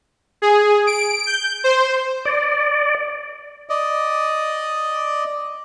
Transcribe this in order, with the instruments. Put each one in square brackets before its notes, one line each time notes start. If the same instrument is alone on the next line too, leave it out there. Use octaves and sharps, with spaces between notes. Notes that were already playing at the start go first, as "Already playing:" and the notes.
[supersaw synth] G#4
D7
G6
C5
[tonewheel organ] D5
[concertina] D5 D#5